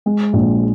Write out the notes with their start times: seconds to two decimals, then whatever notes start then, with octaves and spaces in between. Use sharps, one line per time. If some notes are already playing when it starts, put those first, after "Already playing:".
0.06 G#3
0.33 A#1